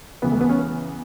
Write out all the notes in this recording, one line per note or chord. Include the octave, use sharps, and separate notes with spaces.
E2 C#3 E3 B3
A3
B3
C#4
B3